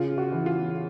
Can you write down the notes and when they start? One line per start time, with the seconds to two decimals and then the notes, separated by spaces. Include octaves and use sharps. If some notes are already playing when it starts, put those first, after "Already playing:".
Already playing: C#3 F4
0.18 F#4
0.32 E3
0.46 F4